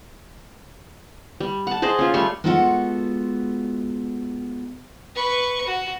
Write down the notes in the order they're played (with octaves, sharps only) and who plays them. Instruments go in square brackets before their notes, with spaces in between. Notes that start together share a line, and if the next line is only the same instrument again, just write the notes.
[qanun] G3
F#5 A5
G#4 C5 D5 D#5
C#4 F4
G3 A3 C#5 C6
[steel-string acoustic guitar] G#3 B3 F4 F#4 A4 F#5
[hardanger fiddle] B4 C#6
F#4